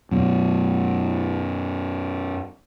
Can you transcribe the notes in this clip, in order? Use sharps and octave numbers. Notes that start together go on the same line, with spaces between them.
F#2 B2